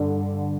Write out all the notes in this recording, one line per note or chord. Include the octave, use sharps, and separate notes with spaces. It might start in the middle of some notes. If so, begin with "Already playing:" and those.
Already playing: G2 D3